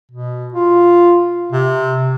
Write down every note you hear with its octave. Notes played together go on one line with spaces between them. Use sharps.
B2
F4
C3